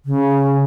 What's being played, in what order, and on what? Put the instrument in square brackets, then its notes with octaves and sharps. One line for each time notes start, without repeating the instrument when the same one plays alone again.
[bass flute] C#3